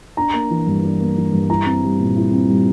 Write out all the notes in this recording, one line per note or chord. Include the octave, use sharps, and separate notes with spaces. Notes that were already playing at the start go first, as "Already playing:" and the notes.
D4 A#5
A#3
E3
G2
D4
A#3
E3
G2
E4 A#5
C4
G3
A#2
E4
C4
G3